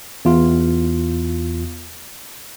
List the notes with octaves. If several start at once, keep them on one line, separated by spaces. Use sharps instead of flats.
E2 F4